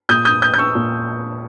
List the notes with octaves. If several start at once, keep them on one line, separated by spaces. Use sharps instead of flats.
A#2 D#6 G6
D#6 G6
D#6 G6
G6
C#6 E6
A#2